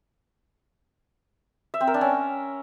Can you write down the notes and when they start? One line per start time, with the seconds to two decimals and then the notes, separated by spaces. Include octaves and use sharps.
1.74 E5
1.81 C4
1.87 A#4
1.94 D4
2.01 C#4